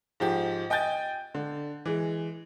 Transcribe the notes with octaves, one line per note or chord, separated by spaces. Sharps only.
G#2 F3 G4
D#5 G5 G#5 G6 A6
D3
E3 G#3